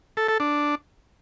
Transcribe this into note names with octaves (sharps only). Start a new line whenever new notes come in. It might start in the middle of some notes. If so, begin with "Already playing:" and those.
A4
A4
D4